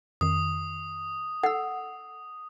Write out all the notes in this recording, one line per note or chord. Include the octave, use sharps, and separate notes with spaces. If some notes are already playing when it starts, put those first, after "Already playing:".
F2 D#3 D#6
A4 F#5 E6